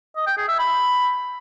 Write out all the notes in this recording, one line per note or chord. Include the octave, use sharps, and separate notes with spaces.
D#5
G5
G#4
E5
B5